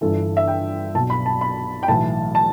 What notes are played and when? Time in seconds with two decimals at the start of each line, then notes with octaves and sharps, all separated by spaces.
0.01 G1 G2 E3 A4
0.37 E5
0.48 G5
0.95 B1 A5
0.98 B2
1.10 B5
1.26 A5
1.41 B5
1.83 G5
1.88 B1 A2 E3 A5
2.35 A5